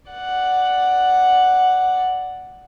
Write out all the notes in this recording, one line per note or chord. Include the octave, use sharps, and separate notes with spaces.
D5 F#5